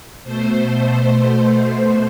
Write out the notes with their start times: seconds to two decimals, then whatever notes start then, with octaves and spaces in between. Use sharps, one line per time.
0.24 B2 A3 C5
1.41 C5